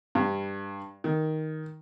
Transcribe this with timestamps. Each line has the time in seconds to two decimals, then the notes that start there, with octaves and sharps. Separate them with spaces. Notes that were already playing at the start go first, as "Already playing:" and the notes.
0.15 G2
1.04 D#3